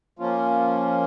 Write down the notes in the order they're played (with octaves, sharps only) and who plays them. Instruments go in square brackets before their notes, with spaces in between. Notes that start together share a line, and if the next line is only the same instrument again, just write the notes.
[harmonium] F3 A#3 C#4 F4